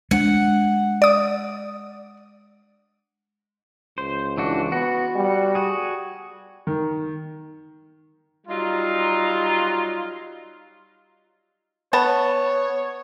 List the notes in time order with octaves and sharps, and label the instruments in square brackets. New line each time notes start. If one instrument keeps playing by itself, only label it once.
[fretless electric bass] G#3 D4 [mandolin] F#5
[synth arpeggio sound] D5 D#6
[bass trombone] C#2 [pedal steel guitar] C5
[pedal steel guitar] E3 D4 F#4
[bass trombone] B3 [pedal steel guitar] F#4
[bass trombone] G3
[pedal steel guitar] F#4 G#4
[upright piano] D#3
[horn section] F#3 G3 D#4 F4
[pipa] B3 A5 [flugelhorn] C#5